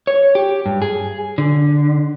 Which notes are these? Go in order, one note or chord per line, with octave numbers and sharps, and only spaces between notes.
C#5
G4
G2
G#4
D3